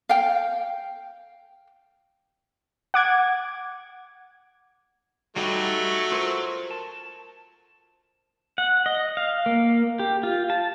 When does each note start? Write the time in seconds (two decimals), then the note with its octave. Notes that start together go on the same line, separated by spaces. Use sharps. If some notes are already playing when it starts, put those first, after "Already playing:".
0.09 F5 G5
2.94 F#5 D6 G#6
5.36 F#3 G3 A3 D#4 B4
5.70 C#6
6.12 F4 A#4 C5
6.71 A5
8.58 F#5
8.86 D#5
9.17 F5
9.46 A#3
9.99 G4
10.23 F4
10.50 A5